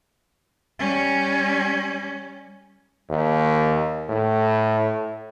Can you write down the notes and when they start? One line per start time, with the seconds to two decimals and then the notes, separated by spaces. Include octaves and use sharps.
0.79 G3 C#4
3.10 D#2
4.09 A2